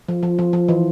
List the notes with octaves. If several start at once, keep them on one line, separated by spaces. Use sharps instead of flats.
F3
F3
F3
F3
E3